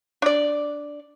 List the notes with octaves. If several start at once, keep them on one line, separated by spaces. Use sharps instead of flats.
D4 D5